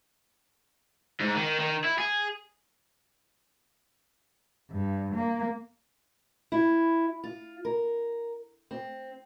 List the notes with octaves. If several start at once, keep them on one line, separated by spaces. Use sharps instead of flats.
G#2
D#3
D#3
E4
G#4
G2
A#3
E4
F4
A#4
C4